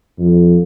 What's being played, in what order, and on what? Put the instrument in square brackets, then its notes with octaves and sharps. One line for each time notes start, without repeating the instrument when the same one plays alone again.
[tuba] F2